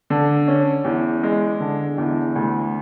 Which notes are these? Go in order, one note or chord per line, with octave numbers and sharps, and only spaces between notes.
D3
C#4
E2
G#3
D3
E2
D2